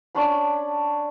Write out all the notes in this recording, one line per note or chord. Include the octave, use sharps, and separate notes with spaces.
C#4 D4 D5 B5